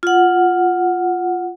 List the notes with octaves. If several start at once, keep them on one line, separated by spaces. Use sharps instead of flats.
F4 F#5